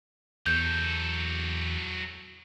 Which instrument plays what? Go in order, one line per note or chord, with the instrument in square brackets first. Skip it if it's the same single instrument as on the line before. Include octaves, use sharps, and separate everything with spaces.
[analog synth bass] E2 [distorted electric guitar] F#3 A4 [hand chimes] G6